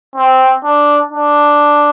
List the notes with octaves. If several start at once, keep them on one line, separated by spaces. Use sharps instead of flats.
C4
D4
D4